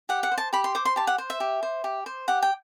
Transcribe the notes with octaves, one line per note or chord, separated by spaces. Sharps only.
G4 F#5
F#5
C5
A5
G4 B5
C6
C5 D6
C6
G4 A5
F#5
C5
E5
G4
C5
G4
C5
G4 F#5
G5